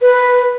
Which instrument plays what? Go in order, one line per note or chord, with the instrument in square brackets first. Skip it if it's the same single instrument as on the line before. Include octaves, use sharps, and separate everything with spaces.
[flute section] B4